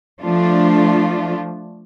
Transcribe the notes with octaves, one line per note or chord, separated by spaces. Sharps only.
F3 A3 D4 F4